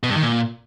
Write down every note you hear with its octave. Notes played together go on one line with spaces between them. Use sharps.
B2
G2
D#3
A#2